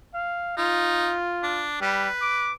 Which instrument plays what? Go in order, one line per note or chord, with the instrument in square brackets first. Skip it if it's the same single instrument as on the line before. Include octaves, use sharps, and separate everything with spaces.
[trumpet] F5
[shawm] D#4 [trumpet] F4
[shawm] D4
[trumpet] G3 [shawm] B4
[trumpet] D6